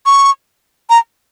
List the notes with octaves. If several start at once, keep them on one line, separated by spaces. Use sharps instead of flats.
C#6
A#5